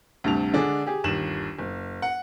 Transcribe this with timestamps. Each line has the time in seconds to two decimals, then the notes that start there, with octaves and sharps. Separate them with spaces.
0.24 D2 G2 C3 A5 F7
0.54 D3 G#3 D4 G#4
0.86 G4 G#4
1.04 G1 D#2 E7 F#7
1.59 F#1
2.02 F#5